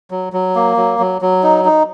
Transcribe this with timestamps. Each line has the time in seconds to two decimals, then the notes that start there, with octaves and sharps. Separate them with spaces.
0.11 F#3
0.33 F#3
0.55 A#3
0.77 F#3
0.99 F#3
1.22 F#3
1.43 D#4
1.65 D#4